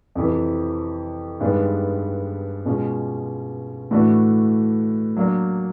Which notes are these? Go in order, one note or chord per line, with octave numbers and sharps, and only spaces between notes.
F2 C3 E3
G2 D#3 G#3 B3 D4
B2 G#3 C#4 F4
A2 E3 A3 D4 F#4
F#3 A#3 D4